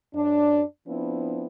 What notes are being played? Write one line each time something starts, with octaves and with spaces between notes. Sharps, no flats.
F#2 D4
F3 B3 C4 D4 E4